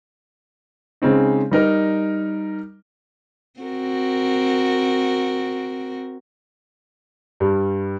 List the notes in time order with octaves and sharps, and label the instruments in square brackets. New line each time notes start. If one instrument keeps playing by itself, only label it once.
[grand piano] C#3 G#3 C4 D#4
G3 D#4 A#4
[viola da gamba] C4 F#4 A#4
[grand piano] G2 G3